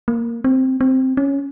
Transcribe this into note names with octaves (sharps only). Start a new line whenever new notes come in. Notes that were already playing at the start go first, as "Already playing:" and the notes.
A#3
C4
C4
C#4